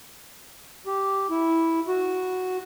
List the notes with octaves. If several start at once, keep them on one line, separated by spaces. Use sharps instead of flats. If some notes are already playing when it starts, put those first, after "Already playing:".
G4
E4
F#4